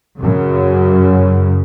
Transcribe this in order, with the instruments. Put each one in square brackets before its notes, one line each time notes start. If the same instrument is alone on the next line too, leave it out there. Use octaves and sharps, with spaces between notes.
[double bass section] F#2 C#3